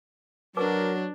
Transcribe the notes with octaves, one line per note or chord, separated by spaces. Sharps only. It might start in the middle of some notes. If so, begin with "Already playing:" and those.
F#3 D4 A#4 B4 A5 D6